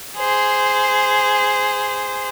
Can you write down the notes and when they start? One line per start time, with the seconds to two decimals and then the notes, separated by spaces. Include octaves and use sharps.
0.17 G#4 C5